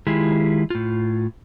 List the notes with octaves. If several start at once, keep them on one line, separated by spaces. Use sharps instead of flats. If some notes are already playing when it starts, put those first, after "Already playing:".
D#3 G#3 E4 F4 G4 G#4
A2 F4